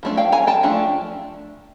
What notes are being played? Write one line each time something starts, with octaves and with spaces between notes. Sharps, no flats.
F3 A3 D4
F5 G5
G#5 A#5
G5 A5
F3 A3 D4